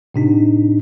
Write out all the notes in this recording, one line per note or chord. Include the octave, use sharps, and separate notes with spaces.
A2 C3 D4 D#4